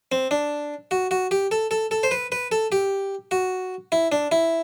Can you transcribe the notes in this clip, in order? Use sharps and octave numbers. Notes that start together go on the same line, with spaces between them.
C4
D4
F#4
F#4
G4
A4
A4
A4
C5
B4
B4
A4
G4
F#4
E4
D4
E4